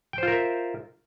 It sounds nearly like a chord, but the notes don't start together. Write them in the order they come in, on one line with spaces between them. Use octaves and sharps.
G5 C5 F4 A#4 E5